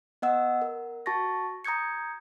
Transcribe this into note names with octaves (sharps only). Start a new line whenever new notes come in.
B3 D#5 F#5 E6
A#4
F#4 A5 C#6 A6 A#6
A#5 D#6 G6 G#6 C#7